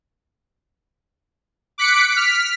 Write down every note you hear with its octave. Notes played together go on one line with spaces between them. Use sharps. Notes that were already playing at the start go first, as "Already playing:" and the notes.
D6 F#6 B6 C#7 D7
F6 B6